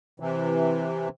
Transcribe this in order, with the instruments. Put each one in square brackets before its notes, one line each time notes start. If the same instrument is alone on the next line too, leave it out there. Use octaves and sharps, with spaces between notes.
[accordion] C3 E3